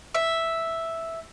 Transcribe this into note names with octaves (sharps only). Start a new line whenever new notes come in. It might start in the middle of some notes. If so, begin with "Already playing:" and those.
E5